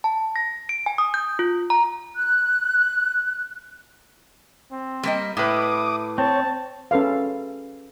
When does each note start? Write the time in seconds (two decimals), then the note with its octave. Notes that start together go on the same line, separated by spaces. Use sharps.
0.04 A5
0.36 A#6
0.69 D7
0.86 G#5
0.98 D#6
1.14 G6
1.39 F4
1.70 A#5
2.16 F#6
4.72 C4
5.03 G3 A#3 D#5
5.37 A2 B4 E5 D6 D#6
6.18 C4 C#5 A5
6.91 C#4 A4 B4 F5